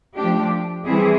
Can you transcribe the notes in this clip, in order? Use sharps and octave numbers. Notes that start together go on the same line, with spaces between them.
F3 A3 D4 G4
E3 G3 C4 E4 G#4